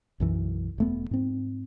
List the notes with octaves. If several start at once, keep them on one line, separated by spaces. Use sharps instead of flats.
B1 F#2 E3
E1 A3 B3
G#2 C4